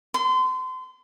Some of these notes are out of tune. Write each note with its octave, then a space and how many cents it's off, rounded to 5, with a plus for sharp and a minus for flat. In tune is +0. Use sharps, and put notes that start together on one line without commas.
C6 -30